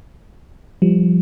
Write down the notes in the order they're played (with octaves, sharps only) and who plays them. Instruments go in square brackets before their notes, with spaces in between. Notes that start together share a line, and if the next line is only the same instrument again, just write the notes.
[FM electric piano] F3 G3